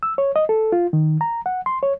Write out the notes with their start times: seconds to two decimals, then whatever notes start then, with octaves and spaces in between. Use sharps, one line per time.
0.03 E6
0.18 C#5
0.36 D#5
0.49 A4
0.72 F4
0.93 D#3
1.21 A#5
1.46 F#5
1.66 C6
1.83 C#5